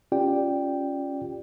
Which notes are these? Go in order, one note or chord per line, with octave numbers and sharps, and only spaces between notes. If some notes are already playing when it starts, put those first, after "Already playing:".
C#4 F4 G4 D5 G5